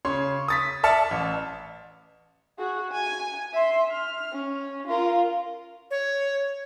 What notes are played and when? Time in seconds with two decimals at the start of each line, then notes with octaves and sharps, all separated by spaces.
0.05 C#3 C#5 C6
0.48 D#6 A6 B6
0.83 D5 E5 A5 F6 A6 C#7
1.11 A1
2.59 F#4 G#4
2.91 G#5
3.53 E5 C6
3.91 F6
4.32 C#4
4.87 F4 A#4
5.91 C#5